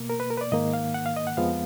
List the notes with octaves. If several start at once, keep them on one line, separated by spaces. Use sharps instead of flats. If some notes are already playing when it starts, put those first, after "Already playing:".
Already playing: B2 A#3
A#4
B4
A#4
B4
D5
G#2 D#3 A#3 D#5
F5
F#5
F5
D#5
F#5
F2 F3 G#3 B3 F5